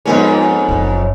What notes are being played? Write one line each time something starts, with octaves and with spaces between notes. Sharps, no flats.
F2 G#2 G#3 B3 C#4 D#4
F#1